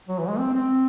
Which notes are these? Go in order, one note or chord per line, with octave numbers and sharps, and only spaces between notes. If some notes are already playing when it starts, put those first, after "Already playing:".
F#3
E3
G#3
C4
C4